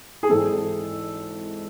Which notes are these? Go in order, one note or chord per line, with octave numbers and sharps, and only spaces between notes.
G#4
G#1 G#2 E3 C4 A4